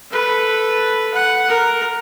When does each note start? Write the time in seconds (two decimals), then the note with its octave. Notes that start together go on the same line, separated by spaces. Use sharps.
0.10 A4 B4
1.14 F#5
1.48 A#4